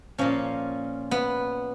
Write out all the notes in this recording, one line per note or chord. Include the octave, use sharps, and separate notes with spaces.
A#2 F3 C#4
B3